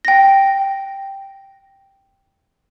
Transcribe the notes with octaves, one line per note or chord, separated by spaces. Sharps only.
G5 A#6